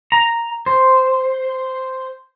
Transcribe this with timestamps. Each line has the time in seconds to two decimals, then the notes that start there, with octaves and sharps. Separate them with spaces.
0.12 A#5
0.66 C5